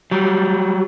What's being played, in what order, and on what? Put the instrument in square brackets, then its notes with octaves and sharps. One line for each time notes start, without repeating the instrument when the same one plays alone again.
[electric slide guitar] F#3 G3